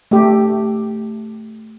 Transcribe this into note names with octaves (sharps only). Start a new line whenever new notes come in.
A3 G4